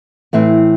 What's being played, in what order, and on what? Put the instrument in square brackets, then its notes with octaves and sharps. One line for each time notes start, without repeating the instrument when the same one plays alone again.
[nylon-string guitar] A2 E3 C4 E4